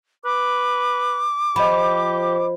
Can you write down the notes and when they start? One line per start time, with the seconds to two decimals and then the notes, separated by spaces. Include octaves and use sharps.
0.25 B4 D6
1.56 F3 G4 D#5 B5